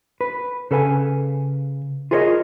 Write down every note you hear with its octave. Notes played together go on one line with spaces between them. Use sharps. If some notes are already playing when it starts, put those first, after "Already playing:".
B4
C#3 A4 B4 F5 G#5
F4 G#4 A#4 C5 C#5 D#5